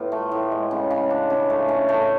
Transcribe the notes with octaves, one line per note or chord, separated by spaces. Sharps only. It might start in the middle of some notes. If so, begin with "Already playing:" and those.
Already playing: A2 B3 F4
A3
A2
G#3
C#3
C#3
D4
C#3
A3
C#4
A3